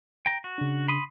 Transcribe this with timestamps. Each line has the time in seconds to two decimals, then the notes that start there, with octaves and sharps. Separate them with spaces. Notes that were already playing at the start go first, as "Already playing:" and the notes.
0.26 G5 A#5
0.44 F#4
0.58 C#3 D4
0.88 B5 C6 D#6